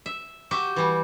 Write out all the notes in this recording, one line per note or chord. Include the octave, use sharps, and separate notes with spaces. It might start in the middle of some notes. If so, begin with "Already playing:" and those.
E5
F#4 G4 E5
E3 G3